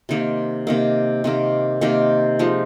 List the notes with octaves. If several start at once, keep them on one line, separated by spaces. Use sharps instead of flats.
C3 D#3 A#3
C3 D#3 A#3
C3 D#3 A#3
C3 D#3 A#3
F3 G#3 D#4